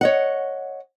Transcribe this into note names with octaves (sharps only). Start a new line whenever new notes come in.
C#5 D#5 F#5